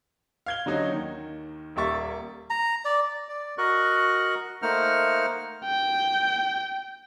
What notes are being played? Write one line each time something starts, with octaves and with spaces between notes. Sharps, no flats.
F5 G#6 G7
D3 F#3 C#4 D#4 F#4
D#2 D#3
D#1 G3 A#3 E5 C#6 A6
A#5
D5
D5
F#4 A#4 D#5 C#6 F#6
A3 A#3 D#4 C5 F#5 F6
G5